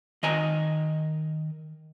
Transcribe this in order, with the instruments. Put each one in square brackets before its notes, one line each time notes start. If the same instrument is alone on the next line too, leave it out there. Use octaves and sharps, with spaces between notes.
[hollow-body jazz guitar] D#3 D#5 G#5 A#5